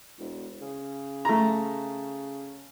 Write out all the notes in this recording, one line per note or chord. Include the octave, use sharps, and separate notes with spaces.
E1
C#3
A3 A#5